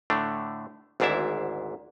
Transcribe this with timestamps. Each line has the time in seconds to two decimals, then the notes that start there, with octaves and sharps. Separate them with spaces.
0.10 A2 D3 A3 D4
1.00 G#1 D2 G#2 D4 E4 E5